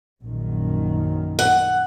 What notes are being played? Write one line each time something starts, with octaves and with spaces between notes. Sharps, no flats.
A#1 F#2 D#3
F#5